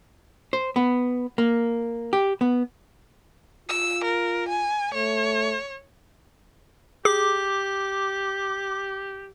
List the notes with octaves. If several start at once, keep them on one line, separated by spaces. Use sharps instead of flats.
C5
B3
A#3
G4
B3
F4 E6
A#4
G#5
A3 C#5
G4 G#4 D6